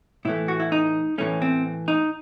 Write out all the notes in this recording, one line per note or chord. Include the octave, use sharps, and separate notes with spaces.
A2 E3 A3 E4
F#4
E4
D#4
A2 E3 A3 C#4
C4
D#4